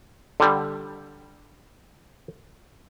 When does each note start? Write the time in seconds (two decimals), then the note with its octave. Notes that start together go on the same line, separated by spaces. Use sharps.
0.40 D3 G3